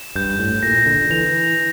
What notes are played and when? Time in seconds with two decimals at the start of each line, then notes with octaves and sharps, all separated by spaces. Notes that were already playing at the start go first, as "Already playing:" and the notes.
Already playing: E7
0.15 G2 G6
0.39 A2
0.63 A#2 A#6
0.86 D3
1.10 E3 F7